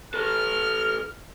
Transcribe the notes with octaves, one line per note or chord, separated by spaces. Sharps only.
A4 B4 F6